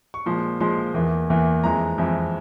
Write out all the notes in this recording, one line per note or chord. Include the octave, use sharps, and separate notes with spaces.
C#6
A#2 F3 G#3 C6
A#2 F3 G#3 C6
E2 E3 A#3
E2 E3 A#3
F2 E3 G#3 A#5
F2 E3 G#3